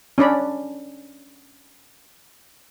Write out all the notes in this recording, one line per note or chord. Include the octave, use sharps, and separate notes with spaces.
C#4 D4 D5 B5